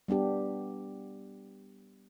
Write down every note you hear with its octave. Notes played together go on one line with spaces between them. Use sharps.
G3 B3 D4 G4